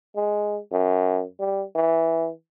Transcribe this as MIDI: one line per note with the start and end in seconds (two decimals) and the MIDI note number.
0.16 0.59 56
0.72 1.23 42
1.40 1.64 55
1.76 2.29 52